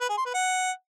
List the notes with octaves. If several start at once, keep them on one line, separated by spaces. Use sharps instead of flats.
B4
G#4
C6
B4
F#5